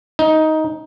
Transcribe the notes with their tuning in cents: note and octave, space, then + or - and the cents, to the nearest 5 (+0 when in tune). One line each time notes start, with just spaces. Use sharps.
D#4 +10